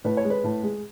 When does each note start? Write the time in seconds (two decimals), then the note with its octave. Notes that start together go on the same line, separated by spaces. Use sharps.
0.04 A2 B4
0.17 C#5
0.24 G#3
0.30 B4
0.44 A2
0.63 G#3